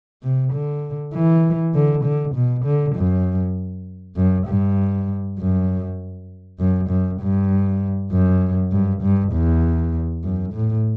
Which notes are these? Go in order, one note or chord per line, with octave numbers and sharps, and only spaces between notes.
C3
D3
E3
D3
D3
B2
D3
F#2
F#2
G2
F#2
F#2
F#2
G2
F#2
G2
G2
E2
F#2
A2